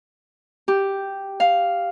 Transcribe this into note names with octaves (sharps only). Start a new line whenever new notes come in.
G4
F5